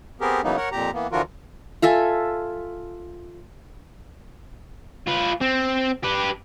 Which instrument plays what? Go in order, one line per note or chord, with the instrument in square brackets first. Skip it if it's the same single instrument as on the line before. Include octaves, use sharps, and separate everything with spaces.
[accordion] B3 C4 G4 G#4 A#4
C#3 E3 F#3 A#3 B3 D#4
A#4 C#5 F#5
F2 A#2 G4 A#5
E3 A#3 B3
D3 E3 F3 F4 F#4 A#4
[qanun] F4 A4 E5 G#5
[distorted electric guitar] F4 B4
C4
G4 B4